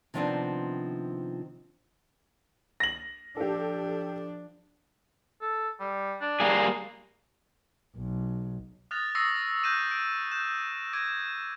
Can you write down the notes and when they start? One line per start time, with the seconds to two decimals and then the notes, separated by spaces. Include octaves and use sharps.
0.14 C3 D#3 F3 B3 C4 D4
2.80 A#6 F#7
3.37 F3 D4 G4 A4
5.41 A4
5.80 G3
6.21 D4
6.40 G3 A#3 G#4
7.96 B1
8.91 D#6 F6 F#6 A6 A#6 F7
9.15 C#6 D#6 E6 A#6 C7 C#7
9.63 F#6 G6 A#6 C#7 D#7 E7
9.91 D7
10.31 F#6 G6 E7
10.93 D6 G#6 A#6 D7 D#7